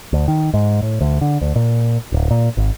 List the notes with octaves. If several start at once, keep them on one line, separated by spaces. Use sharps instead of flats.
D2
D#3
G#2
A2
D2
D3
D2
A#2
D1
A#2
G#1